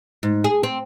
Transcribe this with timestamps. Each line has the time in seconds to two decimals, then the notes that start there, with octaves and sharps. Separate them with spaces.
0.23 G#2
0.44 G#4
0.63 C4